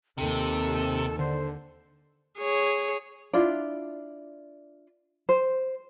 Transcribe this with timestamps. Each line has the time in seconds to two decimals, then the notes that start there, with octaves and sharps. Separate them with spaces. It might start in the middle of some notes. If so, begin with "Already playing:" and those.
0.18 D#2 C3 A4
1.19 D3 C5
2.38 G#4 C#5
3.33 D4 E4 F4 D5
5.29 C5